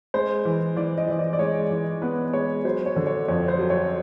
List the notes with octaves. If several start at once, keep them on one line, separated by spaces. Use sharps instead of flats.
G#3 C5
E3
E3 D5
D#5
E3 D#5
D5
D5
G#3 C#5
E3
B3 B4
G#3 C#5
F#3 C5
C#5
D3
C#5
F2 C#5
C5
F#3
C#5